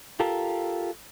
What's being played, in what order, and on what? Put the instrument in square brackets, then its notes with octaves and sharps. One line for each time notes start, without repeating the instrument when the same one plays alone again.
[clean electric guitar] F4 G4 A4 A#4